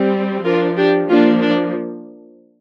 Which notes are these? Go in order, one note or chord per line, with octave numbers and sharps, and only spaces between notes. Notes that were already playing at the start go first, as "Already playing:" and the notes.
Already playing: G3 C4
F3 D4 F4 A#4
D4 G4
F3 A#3 D4 F4
D4